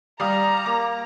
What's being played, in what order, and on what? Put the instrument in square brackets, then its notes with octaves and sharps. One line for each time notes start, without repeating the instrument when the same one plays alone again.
[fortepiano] G3 F5 D#6 [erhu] A#5
[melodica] A#3 [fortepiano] D6